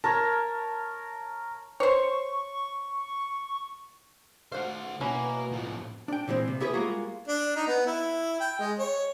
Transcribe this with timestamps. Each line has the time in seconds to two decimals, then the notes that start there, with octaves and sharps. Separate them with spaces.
0.04 A#4 C#5 A5
1.80 C5 C#5 C#6
4.52 F#4 C5 F5 F#5
5.01 B2 A#3 C#4 E4 F#4
5.52 A2 F3
6.08 D4 G5
6.28 A#2 E3 G#3 C4
6.48 C3
6.60 B3 E4 G4 G#4 B4
6.73 G3 G#3 A#3 F4 F#4 G#4
7.28 D4
7.56 D#4
7.68 B3
7.86 E4
8.40 G5
8.59 G#3
8.79 C#5